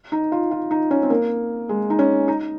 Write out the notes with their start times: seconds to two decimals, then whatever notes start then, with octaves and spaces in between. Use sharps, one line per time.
0.12 D#4
0.32 F4
0.51 F4
0.71 D#4
0.91 C#4
1.03 C4
1.10 A#3
1.69 G#3
1.90 D#4
1.99 C#4
2.28 D#4